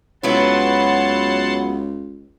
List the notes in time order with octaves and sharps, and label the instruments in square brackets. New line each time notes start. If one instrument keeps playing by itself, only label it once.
[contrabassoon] C#2 [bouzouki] F#3 B3 E4 [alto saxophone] C#5 [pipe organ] F#5 A5 C6